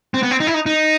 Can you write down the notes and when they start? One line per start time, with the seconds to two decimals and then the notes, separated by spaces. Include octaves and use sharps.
0.14 C4
0.23 B3
0.31 C4
0.40 D#4
0.47 E4
0.54 D#4
0.66 D#4